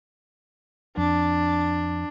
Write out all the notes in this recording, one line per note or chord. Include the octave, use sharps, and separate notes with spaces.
F2 D4